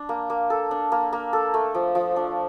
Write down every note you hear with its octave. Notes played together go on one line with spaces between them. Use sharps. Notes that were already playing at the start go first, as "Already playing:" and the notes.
Already playing: D4
A#3
A#3
A4
D4
A#3
A#3
A4
A3
F3
F3
D4